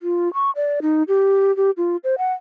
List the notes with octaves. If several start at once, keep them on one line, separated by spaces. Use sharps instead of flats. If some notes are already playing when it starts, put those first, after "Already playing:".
F4
C#6
D5
D#4
G4
G4
F4
C5
F#5